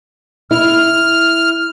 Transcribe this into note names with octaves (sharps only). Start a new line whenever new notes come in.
E4 F6